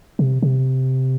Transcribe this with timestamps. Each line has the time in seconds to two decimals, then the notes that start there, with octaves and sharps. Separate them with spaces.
0.19 C3
0.42 C3